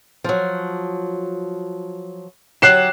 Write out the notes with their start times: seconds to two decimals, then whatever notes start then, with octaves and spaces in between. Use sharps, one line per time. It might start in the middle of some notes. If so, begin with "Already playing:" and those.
0.24 F3 F#3
2.62 F#3 G4 F#6 C7 E7